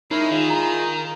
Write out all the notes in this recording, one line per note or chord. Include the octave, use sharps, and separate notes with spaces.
G#3 D#4 E4 A#4 C#5
D#3 F4 G#4
A#5